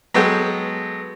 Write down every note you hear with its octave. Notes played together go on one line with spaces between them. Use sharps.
F#3 G#3 B3 A4 G5